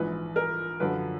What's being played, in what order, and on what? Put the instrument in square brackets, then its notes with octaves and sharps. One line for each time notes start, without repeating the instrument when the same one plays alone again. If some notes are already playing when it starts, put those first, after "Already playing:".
Already playing: [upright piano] A#1 G#2 E3 B4
A#4
F#2 D3 F3 B4